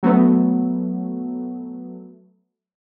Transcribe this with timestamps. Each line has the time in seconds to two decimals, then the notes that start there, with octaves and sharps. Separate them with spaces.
0.03 F#3 A3 B3